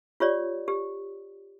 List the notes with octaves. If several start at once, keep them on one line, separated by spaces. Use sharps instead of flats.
F4 G4 C#5 D5
G4